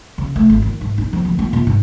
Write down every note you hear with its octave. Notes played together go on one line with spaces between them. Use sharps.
C#3
A3
G#1
D#3
G#2
D#4
F3
D2
A#3
A#2
G#2